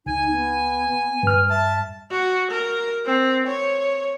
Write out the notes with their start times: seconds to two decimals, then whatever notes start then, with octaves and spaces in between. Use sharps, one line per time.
0.06 C#2 D#4 G#5
0.32 B3
1.23 G2 B4 F6
1.49 E5 A5
2.11 F#4
2.51 A#4
3.06 C4
3.47 C#5